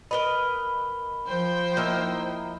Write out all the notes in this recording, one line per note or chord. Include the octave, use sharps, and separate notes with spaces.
A#4 B4 D#5 B5 G7
F3 C5 G5
A#3 D#4 E4